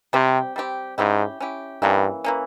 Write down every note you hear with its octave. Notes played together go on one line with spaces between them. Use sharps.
C3 G3 C4 G4
G3 C4 G4
G#2 C#4 E4 G4
C#4 E4 G4
G2 E3 A#3 C#4
E3 A#3 C#4